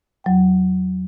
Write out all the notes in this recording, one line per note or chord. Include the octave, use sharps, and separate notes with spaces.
E2 F#3 G5